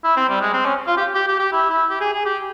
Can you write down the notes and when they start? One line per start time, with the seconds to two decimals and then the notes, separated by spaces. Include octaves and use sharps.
0.04 E4
0.17 C4
0.29 G3
0.41 G#3
0.53 C4
0.65 C#4
0.87 F4
0.97 G4
1.15 G4
1.28 G4
1.39 G4
1.52 E4
1.70 E4
1.90 G4
2.01 G#4
2.13 G#4
2.25 G4